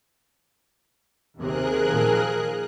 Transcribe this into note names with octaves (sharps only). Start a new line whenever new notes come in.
D#2 C3 G#4 A#4 F#6
A#2 D#3 F3